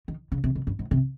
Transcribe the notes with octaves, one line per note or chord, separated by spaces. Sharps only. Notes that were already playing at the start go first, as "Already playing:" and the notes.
D#3
C#3
C3
B2
G2
G#2
C3